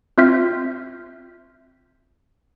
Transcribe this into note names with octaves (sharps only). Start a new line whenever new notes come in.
C4 F4 E5 F6 G6 B6